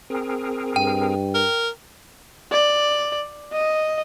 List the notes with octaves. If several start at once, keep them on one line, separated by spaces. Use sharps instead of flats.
C4 G#4 A#4
G2 G5
A#4
D5
D#5